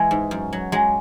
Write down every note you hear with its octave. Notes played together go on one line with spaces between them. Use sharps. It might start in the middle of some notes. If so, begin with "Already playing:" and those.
Already playing: E3 G#3
G#2
F#2
F#3
F#3 G#3